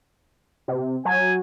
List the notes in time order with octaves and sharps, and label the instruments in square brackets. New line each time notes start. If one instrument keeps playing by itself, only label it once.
[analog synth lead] C3
[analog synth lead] F#3 [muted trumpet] G#5